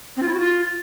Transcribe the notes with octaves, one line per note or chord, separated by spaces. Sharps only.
C4
F4
E4
F#4
F4